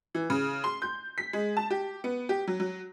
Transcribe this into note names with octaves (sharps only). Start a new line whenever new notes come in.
E3
C#3
C6
G6
B6
G#3
A5
G4
B3
G4
F#3
F#3